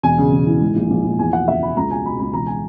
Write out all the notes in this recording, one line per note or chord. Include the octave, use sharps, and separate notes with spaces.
E1 G#5
C#3
E1
E3
G#2
A#1
A#1
A#1
E2 G#5
B2 F#5
F#1 E5
B2 B5
C#2 A#5
B2 G#5
B2 B5
C#2 B5
E1 A#5
G#5